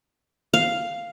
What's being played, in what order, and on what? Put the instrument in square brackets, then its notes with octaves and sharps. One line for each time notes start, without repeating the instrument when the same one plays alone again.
[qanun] F5